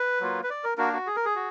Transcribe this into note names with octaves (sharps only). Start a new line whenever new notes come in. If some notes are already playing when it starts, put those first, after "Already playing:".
Already playing: B4
F#3 A#3 F4
B4
D5
A#4
A#3 D4 F#4 A#4
F#4
G#4
A#4
G#4
F#4